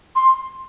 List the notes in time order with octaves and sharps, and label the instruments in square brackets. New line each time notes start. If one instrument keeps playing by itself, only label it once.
[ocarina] C6